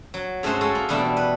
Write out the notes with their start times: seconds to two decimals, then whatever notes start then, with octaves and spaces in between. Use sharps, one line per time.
0.14 F#3
0.43 G#2 A3 C#4 F#4 C5 C6
0.61 G#3 A4 C6
0.75 A#3
0.89 B2 E3 G3 A3 D4
1.17 B4